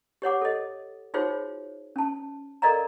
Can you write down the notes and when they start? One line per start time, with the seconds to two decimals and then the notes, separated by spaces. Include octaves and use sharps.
0.22 G4 C#5 F#5 D6
0.42 A4 D#5
1.14 D#4 F4 F#4 G#4 C5 C#5
1.96 C#4 A5
2.62 A4 A#4 D5 D#5 F5 A#5